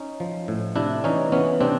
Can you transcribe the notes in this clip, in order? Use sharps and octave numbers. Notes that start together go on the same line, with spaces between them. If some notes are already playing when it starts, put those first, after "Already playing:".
Already playing: C#4 D#4
F3
A2
C3 D4 E4
E3 C#4 D#4
E3 B3 C#4
C3 C4 D4